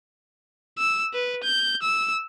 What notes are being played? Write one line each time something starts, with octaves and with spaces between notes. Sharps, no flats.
E6
B4
G6
E6